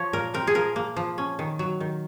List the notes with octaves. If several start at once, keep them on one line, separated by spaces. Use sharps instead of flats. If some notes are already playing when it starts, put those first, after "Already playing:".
Already playing: F3 C#5
A#2 A#4
C4 A#4
G#4
F3 A#4
A#3
F3
C#4
D#3
F#3
D#3